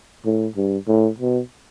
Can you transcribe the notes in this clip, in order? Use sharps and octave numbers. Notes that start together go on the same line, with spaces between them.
A2
G2
A2
B2